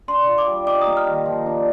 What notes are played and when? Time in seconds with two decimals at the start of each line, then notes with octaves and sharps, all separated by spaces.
0.08 D4 C6
0.27 F4
0.38 D6
0.47 G3
0.67 D#4 D6
0.81 A#3 D#6
0.97 F6
1.07 D#3
1.26 F3
1.46 D4